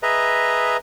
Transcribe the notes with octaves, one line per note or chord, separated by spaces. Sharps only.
G#4 B4 D#5 E5 A#5